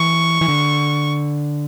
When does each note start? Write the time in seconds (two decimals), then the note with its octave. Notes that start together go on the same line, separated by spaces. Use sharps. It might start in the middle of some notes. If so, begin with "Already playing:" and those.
Already playing: E3 C#6
0.41 E3
0.48 D3